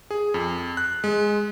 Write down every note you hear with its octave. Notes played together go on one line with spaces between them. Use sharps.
G#4
F2
F#6
G#3